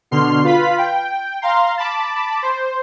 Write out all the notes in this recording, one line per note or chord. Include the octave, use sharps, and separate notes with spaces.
B2 D3 C6 F6 C7
F4 B4 F5 B5 B6
G5
F5 A#5 C6
A5 B5 D6
C5